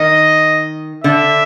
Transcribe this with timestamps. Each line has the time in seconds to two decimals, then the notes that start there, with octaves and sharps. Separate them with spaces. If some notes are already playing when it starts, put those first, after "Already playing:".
Already playing: D#3 D#5
1.04 D3 E5